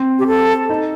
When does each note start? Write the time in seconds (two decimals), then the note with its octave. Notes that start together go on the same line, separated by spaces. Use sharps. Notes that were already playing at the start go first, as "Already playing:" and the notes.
Already playing: C4
0.19 G4
0.27 A4
0.70 D#4